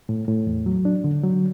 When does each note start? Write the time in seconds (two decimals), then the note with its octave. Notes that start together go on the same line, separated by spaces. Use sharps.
0.09 A2
0.28 A2
0.47 E2
0.66 F#3
0.85 D4
1.04 D3
1.24 F#3